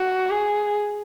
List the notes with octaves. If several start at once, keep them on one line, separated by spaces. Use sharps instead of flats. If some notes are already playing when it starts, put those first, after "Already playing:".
Already playing: F#4
G#4